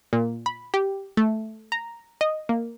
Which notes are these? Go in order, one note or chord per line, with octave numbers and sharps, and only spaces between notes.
A#2
B5
G4
A3
A#5
D#5
A#3